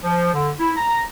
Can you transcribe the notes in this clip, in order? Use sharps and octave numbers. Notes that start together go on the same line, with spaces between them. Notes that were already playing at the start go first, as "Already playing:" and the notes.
F3
D3
E4
A#5